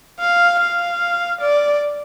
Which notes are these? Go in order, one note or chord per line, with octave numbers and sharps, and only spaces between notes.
F5
F5
D5